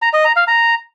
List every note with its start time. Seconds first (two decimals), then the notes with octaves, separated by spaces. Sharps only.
0.02 A#5
0.13 D#5
0.25 A#5
0.36 F5
0.48 A#5